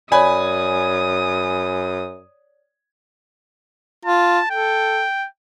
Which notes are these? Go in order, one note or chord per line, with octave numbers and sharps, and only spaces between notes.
F#2 C#5 D5 G#5 B5 D#6
F4 A5
A4 G5